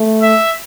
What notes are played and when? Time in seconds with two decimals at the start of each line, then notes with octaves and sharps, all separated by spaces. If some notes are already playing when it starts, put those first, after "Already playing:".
Already playing: A3
0.22 E5